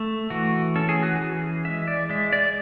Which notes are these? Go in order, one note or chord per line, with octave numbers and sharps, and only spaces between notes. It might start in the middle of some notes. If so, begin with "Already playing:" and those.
Already playing: A3
E3 F#4
C#4 A4
G#4
F#4
E3 G#4
G#3 E5
D5
G#3 E5
D5